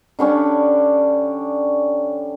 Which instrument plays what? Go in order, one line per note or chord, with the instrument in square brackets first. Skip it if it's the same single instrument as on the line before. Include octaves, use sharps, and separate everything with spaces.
[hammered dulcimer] D3 G3 C#4 D4